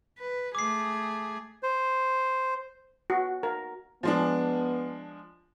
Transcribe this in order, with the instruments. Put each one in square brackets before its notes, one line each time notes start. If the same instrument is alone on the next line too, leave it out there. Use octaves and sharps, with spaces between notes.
[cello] B4
[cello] A3 G#4 [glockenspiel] D6 C7
[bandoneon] C5
[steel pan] F#4
A#4
[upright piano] F3 G#3 D4 [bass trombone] B3